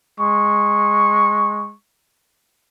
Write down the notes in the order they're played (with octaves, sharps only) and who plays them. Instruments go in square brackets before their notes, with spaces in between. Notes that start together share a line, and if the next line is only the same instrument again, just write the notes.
[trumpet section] G#3 C#6